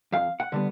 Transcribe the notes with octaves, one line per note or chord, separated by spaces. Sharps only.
F2 F5
F#5
D3 G3 B3